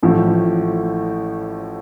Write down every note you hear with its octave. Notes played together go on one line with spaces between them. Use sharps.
A1 A2 F3 A3